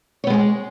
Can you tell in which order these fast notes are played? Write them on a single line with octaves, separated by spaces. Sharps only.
C#5 B3 G#3 G#4